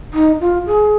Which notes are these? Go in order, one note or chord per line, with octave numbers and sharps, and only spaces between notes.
D#4
F4
G#4